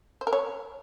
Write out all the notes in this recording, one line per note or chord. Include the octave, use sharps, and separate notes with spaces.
C5
A#4
C#5